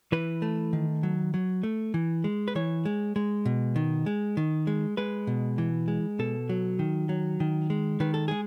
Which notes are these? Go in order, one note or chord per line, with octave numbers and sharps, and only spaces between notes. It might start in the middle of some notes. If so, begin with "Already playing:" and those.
E3 B4
A3
D#3
F#3
F#3
A3
E3
G#3
B4
E3 C#5
G#3
G#3
B2
D#3
G#3
D#3
G#3
G#3 B4
B2
E3
G#3
B2 A4
F#3
D#3
F#3
D#3
G#3
D#3 B4
A4
G#3 G#4